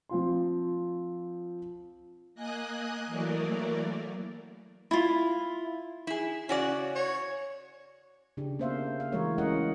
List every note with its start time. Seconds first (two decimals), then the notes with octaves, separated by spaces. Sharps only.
0.09 F3 C4 F4 C6
2.35 A#3 D#5 G#5 D#6 F#6
3.07 E3 F#3 A3 A#3 A#4 D5
4.91 E4 F4
6.07 E4 G#4
6.49 C#3 C#4 F#4 D5
6.95 C#5
8.37 C#3 D4 G4
8.59 A#3 B3 C5 E5 F5
9.00 F5
9.12 E3 G#3 A3 F#4 A#4 C#5
9.38 G#3 C#4 A#4 D#5 F#5